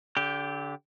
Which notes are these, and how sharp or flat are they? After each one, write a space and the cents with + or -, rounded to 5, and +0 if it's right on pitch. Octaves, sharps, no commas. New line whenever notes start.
D3 -30 G4 +0